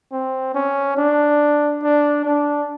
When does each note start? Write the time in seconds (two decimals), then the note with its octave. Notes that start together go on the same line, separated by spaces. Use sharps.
0.12 C4
0.55 C#4
0.97 D4
1.83 D4
2.25 D4